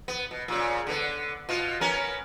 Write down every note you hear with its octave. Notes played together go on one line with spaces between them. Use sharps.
B3
B2
A#2 C#3
D3 B3
B2 F4
B3 C#4 A#4